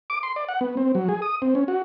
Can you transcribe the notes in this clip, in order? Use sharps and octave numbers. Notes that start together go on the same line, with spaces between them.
D6
C6
D5
F#5
B3
C4
F#3
G#4
D#6
C4
C#4
F#4